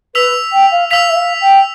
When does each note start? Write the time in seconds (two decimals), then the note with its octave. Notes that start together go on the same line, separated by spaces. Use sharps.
0.15 B4 E6 B6 F7
0.52 G5
0.71 F5
0.91 F5 E6 B6 F7
1.09 E5
1.15 F5
1.41 G5